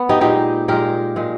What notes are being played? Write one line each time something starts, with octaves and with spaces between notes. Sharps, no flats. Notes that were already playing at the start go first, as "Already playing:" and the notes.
Already playing: B3
D#4 G4
A#2 G#3 D#4 G4
A#2 G#3 G4 A#4
A#2 G#3